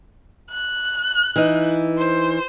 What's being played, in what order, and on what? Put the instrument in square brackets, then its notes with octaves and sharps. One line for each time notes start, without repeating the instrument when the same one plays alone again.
[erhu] F#6
[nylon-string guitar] E3 D#4
[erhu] C5